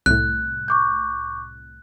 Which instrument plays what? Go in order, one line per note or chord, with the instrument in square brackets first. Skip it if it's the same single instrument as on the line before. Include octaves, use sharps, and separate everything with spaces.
[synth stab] C2 A2 [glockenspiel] F#6
[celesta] C#6 D6 G6